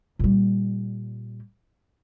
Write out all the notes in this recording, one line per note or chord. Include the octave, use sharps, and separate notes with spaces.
A#2 G3